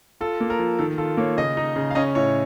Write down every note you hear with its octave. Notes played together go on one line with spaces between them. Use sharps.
F4 A4
A#3
A#4
F3
D#3 A4
F4 A4
A#3 C#5
C#3 D#5
D#4
C#3
F5
C#4 D#5
A2 C#5